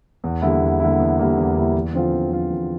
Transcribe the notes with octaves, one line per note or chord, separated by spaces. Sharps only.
E2
D3 G3 A#3 E4
E2
D3 G3 A#3 E4
E2
D3 G3 A#3 E4
E2
D3 G3 A#3 E4
E2
D3 F3 C4 F4
E2
D3 F3 C4 F4
E2